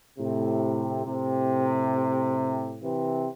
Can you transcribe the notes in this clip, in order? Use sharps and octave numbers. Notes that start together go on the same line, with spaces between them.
A2 C3
A2 C3
C3 E3